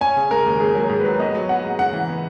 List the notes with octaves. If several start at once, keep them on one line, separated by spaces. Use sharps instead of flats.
C#4 G#5
C#3
G#3 A#4
D#2
G#2 G#4
F#3
A#4
G#2
B4
F#3
B3 D#5
F#3
B3 F#5
G#2
C#3 F#5
E3
B3